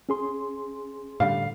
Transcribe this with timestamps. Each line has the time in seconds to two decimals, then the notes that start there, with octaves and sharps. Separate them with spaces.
0.09 C#4 G#4 C6
1.20 A2 D3 G3 F5